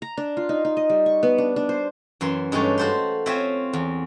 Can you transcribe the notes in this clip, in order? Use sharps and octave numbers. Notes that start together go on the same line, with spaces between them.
A#5
D4
F4
D#4
D#4
D#5
G3
C#6
B3
D4
D4
C5
F#2 E3 E5 C6
G2 G#3 A3 C#4 G4
F#4 A4 C5 F5 C6
C4 F4 C#5 E5 G#5
E2